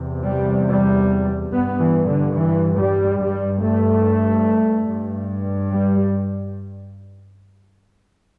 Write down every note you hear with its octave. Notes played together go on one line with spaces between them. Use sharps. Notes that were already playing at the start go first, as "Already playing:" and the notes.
Already playing: E2 C3
G3
G3
G2 B3
E3
D3
E3
G3
G2 G3
A3
G2
G3